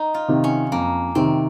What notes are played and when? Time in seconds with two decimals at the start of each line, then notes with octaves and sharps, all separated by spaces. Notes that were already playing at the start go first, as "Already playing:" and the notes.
Already playing: D#4
0.14 F4
0.28 C3 D#3
0.44 C#4
0.72 F2 A#3
1.15 C3 D#3 C4